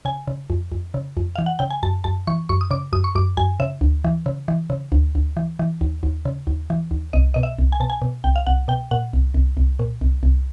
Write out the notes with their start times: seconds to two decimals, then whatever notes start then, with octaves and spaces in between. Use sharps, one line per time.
0.05 C#3 G#5
0.27 C#3
0.50 F2
0.72 F2
0.94 C#3
1.17 F2
1.36 E3 F5
1.46 F#5
1.59 C#3 G5
1.71 G#5
1.83 F#2 A5
2.04 F#2 A5
2.27 E3 C#6
2.49 F#2 C#6
2.61 D#6
2.71 C#3 D6
2.93 F#2 D#6
3.04 C#6
3.15 F#2 D6
3.37 F#2 G#5
3.60 C#3 E5
3.81 D2
4.04 E3
4.26 C#3
4.48 E3
4.70 C#3
4.92 D2
5.15 D2
5.37 E3
5.59 E3
5.81 D#2
6.03 D#2
6.25 C#3
6.47 D#2
6.70 E3
6.91 D#2
7.13 C2 D#5
7.34 B2 D#5
7.43 E5
7.59 C2
7.72 G#5
7.80 B2 A5
7.90 G#5
8.02 B2
8.24 C2 G5
8.36 F5
8.47 C2 F#5
8.68 B2 G5
8.91 A#2 F#5
9.13 C2
9.34 C2
9.57 C2
9.79 A#2
10.01 C2
10.23 C2